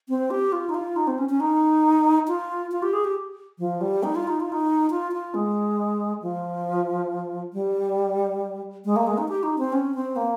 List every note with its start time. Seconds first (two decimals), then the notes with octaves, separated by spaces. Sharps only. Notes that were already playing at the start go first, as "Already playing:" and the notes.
0.09 C4
0.31 G4
0.52 F4
0.69 D#4
0.74 F4
0.96 D#4
1.07 C4
1.18 C#4
1.29 C#4
1.40 D#4
2.28 F4
2.72 F4
2.83 G4
2.93 G#4
3.05 G4
3.59 F3
3.81 G3
4.03 D#4
4.15 F4
4.28 D#4
4.40 F4
4.52 D#4
4.91 F4
5.12 F4
5.34 G#3
6.22 F3
7.53 G3
8.85 G#3
8.96 A#3
9.07 G#3
9.18 D#4
9.29 G4
9.43 D#4
9.58 C4
9.73 C#4
9.95 C4
10.16 A#3